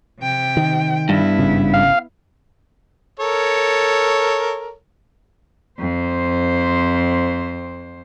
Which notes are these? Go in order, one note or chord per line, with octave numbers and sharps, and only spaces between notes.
C3 G5
D#3
G2 B3 E4
G#1 C#3
F5
A4 A#4 C#5
F2 C5